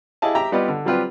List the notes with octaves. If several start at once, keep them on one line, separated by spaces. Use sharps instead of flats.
E4 G4 G#4 D#5 F5 A5
G4 E5 G5 A#5
G3 B3 F4 G4 D5 D#5
D3
F#3 G3 C4 F4 G4 B4